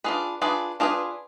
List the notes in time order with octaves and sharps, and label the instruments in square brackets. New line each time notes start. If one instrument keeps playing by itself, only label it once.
[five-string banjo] D4 F4 G#4 B4
D4 F4 G#4 B4
D4 F4 G#4 B4